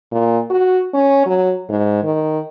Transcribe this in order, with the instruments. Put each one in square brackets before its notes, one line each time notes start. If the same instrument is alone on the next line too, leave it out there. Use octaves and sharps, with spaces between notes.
[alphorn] A#2
F#4
C#4
F#3
G#2
D#3